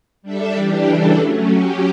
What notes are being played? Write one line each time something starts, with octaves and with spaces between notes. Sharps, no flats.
G3 D4 A4 E5
E3 G3 D4 G4
C#3 E3 G3 D4 A4
F#3 A3 C#4
F#3 C#4 G4